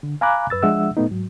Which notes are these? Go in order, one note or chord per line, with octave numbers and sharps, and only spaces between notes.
D3
F5 G#5 A#5 B5 D6 F#6
F#2 B4 E6 A6
F3 G#3 D4 E5 F#5 E6
A#2 A3 B3 D#4
G#2 F#3